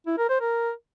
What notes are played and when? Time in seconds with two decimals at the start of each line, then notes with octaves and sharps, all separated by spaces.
0.07 E4
0.18 A#4
0.29 C5
0.41 A#4